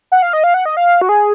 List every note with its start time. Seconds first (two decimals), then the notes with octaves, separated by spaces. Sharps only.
0.12 F#5
0.22 F5
0.33 D#5
0.44 F5
0.54 F#5
0.66 D#5
0.77 F5
1.02 F#4
1.09 G#4